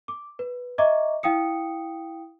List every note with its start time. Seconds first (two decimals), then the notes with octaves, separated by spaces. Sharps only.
0.08 D6
0.39 B4
0.78 D#5 E5 A#5 C#6 D6
1.23 E4 F5 G5 D#6 C#7